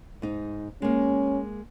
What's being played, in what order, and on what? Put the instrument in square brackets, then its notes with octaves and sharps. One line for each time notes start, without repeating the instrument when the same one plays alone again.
[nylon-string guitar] G#2 D#4
[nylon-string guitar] G#3 A#3 [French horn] C#4